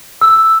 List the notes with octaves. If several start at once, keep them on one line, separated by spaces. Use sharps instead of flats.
E6